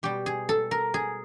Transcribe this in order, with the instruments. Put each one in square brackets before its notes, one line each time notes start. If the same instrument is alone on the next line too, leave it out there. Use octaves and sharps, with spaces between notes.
[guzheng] B2 G3 G4
G#4
A4
A#4
G#4